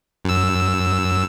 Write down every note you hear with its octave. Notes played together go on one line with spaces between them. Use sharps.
F#2 E6